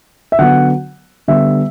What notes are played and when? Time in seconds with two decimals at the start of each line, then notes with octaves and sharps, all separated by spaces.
0.32 E5
0.39 D3 F#3 B3 F#5
1.28 D3 G3 B3 E5